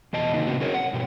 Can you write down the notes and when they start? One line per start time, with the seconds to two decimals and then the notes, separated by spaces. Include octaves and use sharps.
0.13 E2 B2 D#5 A5
0.33 C3 D#3 A#3 D#4 F#4
0.47 A2 C3 G#3 C4 F#4
0.60 C#4 G#4 A#4 C#5
0.74 F#5
0.93 G2 B2 G4